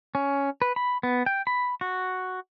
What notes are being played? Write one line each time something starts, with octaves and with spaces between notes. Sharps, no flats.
C#4
B4
B5
B3
G5
B5
F#4